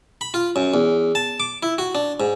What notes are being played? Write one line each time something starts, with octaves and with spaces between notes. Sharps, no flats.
B5
F4
F#2
E2
A5
D6
E4
F#4
D4
G#2